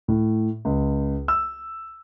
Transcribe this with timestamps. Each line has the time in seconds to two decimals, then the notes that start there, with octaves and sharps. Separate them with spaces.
0.08 A2
0.65 C#2
1.28 E6